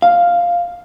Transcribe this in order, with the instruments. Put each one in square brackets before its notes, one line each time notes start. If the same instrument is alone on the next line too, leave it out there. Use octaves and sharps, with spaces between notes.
[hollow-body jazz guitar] F5